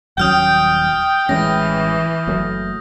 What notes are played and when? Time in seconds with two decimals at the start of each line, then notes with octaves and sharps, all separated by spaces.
0.18 D#1 F#3 C#4 G5 D#6 F6 G6
1.29 A1 E3 G#3 C#4 A#6
2.27 F#1 F#3 A3